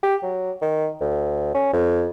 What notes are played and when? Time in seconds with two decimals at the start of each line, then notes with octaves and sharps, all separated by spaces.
0.03 G4
0.23 F#3
0.62 D#3
1.01 D2
1.54 C#4
1.73 F2